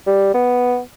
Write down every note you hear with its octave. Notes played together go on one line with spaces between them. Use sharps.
G3
B3